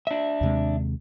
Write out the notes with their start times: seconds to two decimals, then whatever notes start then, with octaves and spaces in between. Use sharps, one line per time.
0.07 D4 E5
0.41 D#2 C3 G#3